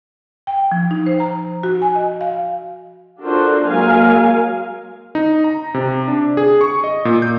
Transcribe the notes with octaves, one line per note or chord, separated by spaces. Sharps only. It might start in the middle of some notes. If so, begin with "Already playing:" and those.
G5
F3
D#4
C5
A#5
F#4
G#5
D#5
F5
D4 F4 F#4 A4 A#4 C5
F#3 G#3 A#3 A#4 F5 G#5
D#4
A#5
C3
D4
G#4
C#6
D#5
A#2
G6